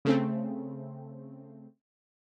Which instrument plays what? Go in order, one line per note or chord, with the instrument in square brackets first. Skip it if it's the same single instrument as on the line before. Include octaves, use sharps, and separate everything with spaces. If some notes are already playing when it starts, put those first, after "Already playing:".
[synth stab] C#3 A3 C4